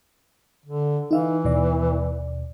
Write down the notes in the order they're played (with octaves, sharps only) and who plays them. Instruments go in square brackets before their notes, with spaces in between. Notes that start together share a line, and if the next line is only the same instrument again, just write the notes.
[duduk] D3
[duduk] E3 [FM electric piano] D#4 E5 F5
[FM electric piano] D#2 B2 D5